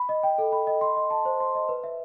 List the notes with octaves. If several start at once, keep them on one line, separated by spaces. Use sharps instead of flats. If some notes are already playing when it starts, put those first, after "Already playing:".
Already playing: B5
D#5
G5
A4
B5
D#5
C6
D#5
A5
C5
C6
D#5
B4
E5